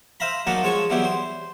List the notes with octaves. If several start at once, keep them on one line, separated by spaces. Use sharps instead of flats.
C5 E5 F5 A#5 B5
F#3 A#3 D#4 F#5 A5
F3 G#3 C#5 A5 C#6
E3 F#3 G3 B3 E4 G4
C5